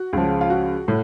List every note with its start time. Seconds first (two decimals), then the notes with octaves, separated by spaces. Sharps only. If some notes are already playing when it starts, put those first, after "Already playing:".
Already playing: F#4
0.13 C#2 C#3 F3
0.41 F4
0.50 F#4
0.88 A2